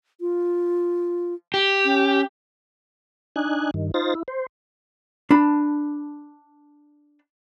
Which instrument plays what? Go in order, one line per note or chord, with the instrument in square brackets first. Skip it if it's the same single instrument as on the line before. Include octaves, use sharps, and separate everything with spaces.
[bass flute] F4
[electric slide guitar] G4
[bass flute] C#4
[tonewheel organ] D4 D#4 G#5 F#6
G2 D#3
D#4 F4 C5 A6 A#6
E4
C5
[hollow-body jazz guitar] D4 A5 B5